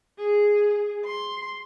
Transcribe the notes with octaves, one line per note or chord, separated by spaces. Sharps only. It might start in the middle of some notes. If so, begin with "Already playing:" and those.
G#4
C6